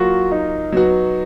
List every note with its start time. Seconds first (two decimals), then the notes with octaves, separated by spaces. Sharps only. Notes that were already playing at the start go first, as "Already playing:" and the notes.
Already playing: F#3 A#3 F4 F#4
0.32 D#4
0.72 F#3 B3 F#4